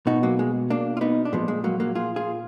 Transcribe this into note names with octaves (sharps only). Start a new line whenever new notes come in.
B2 D#4 F#4
F#3 A#3
G#3
A#3 D4
F4
B3 D#4
D4
A#2 F3 G#3 B3
G#3
F#3 A#3
F#3 A#3
F4 G#4
F4 G#4